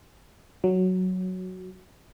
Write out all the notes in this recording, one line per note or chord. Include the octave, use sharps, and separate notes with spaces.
F#3